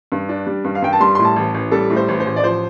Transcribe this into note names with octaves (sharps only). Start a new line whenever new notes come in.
G2
D4
G3
G2
F5
G2 G5
A5
G3 C6
A2 C6
A5
A1
A1
G3 A4
A2
C5
A1
C5
A1
D5
F3 C5